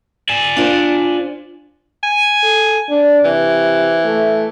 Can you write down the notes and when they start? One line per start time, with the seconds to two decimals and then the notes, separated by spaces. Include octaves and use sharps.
0.29 D5 G#5
0.57 D4 F4 C5
2.03 G#5
2.43 A4
2.89 D4
3.24 C3 E3
4.05 A3